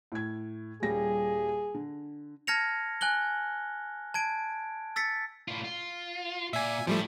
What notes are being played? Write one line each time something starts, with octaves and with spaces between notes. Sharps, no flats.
A2 G#6
D#1 G3 G#4 A#6
D3
A5 F6 G#6 A#6 C#7 F7
G#5 F#6 F#7 G7
A5 G#6 D7
E6 A6 B6 C#7
A2 F4
F4
A#2 E5 G#5
A2 F3 G3 A3